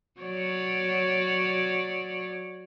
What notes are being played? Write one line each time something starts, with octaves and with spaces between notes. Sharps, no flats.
F#3 C#5 D5